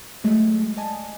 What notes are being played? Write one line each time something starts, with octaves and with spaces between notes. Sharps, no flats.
F#3 G#3 A3 D#5
D5 D#5 G#5 A5